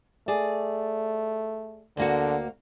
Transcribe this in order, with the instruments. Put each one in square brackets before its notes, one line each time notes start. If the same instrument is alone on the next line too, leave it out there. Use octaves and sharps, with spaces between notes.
[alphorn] A3 [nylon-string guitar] G#4 D5
[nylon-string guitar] D2 A#3 F#4 [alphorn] D3